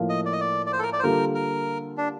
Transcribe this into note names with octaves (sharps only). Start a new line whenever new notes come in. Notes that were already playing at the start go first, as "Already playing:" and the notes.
Already playing: A2 F3 A#3 F4
D#5
D5
D#5
D5
D5
C5
A4
A#4
D5
C5
D3 G3 A#3 F4 A4 A#4
A#4
D4